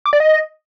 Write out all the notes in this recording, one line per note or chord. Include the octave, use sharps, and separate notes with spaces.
D6
D5
D#5